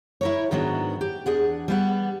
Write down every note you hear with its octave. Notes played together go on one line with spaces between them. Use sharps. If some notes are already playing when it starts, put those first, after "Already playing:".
E4 A#4 C#5
G#2 D#3 F#3 B3 D4
G4
E2 D4 G#4 F#5
G3 B3 F#5